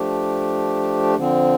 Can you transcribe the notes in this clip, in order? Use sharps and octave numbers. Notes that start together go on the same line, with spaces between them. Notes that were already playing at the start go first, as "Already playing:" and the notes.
Already playing: F3 A3 D4 G4
D3 F3 C4